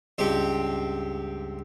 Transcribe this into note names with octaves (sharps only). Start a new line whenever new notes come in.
C#2 G2 C4 G4